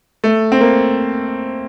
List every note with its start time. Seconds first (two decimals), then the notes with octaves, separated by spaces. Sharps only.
0.24 A3
0.52 C4
0.61 A#3